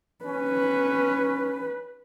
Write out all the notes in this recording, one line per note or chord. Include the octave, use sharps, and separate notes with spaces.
C#4 B4